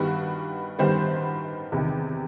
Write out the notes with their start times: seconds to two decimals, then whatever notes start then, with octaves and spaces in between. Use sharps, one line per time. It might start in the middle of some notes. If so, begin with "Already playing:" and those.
Already playing: G2 D#3 G3 B3 F#4
0.79 G2 D#3 G3 B3 C5
1.72 E2 C3 D#3